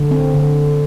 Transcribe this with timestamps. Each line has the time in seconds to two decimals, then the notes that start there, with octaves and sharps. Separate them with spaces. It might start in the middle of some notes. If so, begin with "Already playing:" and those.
Already playing: D3
0.11 C4
0.34 D3